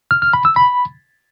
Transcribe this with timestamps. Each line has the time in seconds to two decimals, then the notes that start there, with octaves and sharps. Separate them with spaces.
0.11 F6
0.22 F6
0.33 B5
0.45 E6
0.56 B5